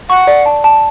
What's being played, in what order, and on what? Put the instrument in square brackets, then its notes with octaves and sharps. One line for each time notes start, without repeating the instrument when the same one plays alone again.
[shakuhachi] F#5 [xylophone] C#6
[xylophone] D5
A5
A5